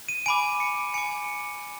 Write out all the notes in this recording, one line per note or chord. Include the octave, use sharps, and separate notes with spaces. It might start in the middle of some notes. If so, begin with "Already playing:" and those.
D#7
G#5 B5 D6 D7
C#7
G#5 B5 D6 C#7